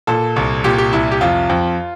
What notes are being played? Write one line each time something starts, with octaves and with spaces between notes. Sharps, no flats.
A#2 A4
C2
A#2 G4
G4
C2 E4
G4
F2 F4
F2